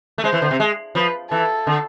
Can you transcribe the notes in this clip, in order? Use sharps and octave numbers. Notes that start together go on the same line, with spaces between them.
A3
G#3 C5
E3
D3
C3
G#3
F3 B4
E3 A4
D3